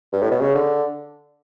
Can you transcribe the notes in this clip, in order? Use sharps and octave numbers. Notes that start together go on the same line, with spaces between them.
G2
A2
B2
C#3
D3